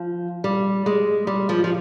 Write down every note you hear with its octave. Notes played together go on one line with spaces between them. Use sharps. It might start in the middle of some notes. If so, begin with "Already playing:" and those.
Already playing: F3
G3
G#3
G3
F3
F3